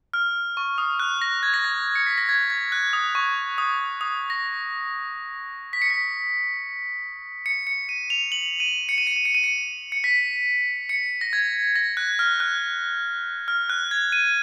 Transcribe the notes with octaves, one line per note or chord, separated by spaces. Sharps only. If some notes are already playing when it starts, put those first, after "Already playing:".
F6
C#6
D#6
F#6
A#6
G#6
A#6
G#6
C#7
B6
A#6
G#6
G#6
F#6
D#6
C#6
D#6
D#6
A#6
B6
C#7
B6
C#7
C#7
D#7
F7
F#7
D#7
C#7
D#7
C#7
D#7
C#7
D#7
C#7
C#7
B6
C#7
A#6
G#6
A#6
F#6
F6
F#6
F6
F#6
G#6
D#7